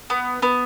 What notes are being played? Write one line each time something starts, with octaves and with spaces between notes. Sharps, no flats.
B3
B3